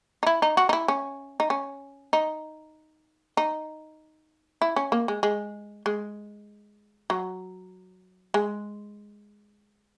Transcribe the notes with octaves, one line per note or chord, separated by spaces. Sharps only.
D#4
E4
D#4
F#4
D#4
E4
C#4
D#4
C#4
D#4
D#4
E4
C#4
A#3
G#3
G#3
G#3
F#3
G#3